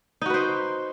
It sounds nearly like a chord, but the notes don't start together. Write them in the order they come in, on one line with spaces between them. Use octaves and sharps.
D#4 F#4 B4 C5